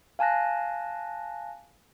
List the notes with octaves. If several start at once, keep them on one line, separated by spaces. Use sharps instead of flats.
F5 G#5 A5 F#6 A#6